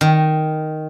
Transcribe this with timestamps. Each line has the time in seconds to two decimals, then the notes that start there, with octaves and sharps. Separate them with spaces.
0.01 D#3